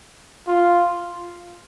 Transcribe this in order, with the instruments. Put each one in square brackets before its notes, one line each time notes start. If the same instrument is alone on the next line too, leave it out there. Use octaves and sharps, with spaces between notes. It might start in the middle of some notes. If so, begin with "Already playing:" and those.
[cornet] F4